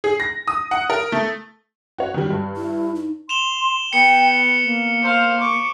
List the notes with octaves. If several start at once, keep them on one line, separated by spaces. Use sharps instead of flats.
G#4
A#6
D#6
F#5
A#4
A3
F#4 C#5
D#3 F#3 G3
G2
E4
D#4
C6 E7 F7 G7
B3 G5 C#7
A#3
C5 F5
C#6 D6